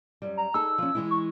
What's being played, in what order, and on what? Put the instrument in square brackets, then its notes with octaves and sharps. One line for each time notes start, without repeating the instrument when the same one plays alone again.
[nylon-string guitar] F#2 G3
[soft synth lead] A#5
[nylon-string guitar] D#4 G#4 A4 [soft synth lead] E6
[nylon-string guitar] F3 C#4
E3 G#3 E4
[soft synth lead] C#6